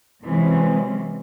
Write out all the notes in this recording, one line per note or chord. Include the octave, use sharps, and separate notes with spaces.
C3 E3 F#3 G#3 C4 C#4